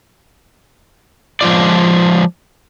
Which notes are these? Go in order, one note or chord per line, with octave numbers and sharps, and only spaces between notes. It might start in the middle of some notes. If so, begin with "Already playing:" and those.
F3 G#3 F4 D5